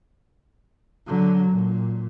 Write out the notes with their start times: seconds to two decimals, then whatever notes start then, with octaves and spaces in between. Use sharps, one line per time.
1.07 D3 F#3
1.50 A#2